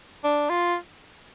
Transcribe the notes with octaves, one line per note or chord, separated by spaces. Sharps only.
D4
F4